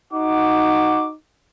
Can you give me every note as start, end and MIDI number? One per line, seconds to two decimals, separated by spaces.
0.13 1.16 63
0.13 1.09 66
0.13 1.09 78
0.13 1.09 86